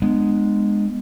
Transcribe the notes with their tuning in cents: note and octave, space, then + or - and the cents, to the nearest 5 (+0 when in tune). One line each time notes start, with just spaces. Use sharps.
G#3 +0 B3 +0 D4 +35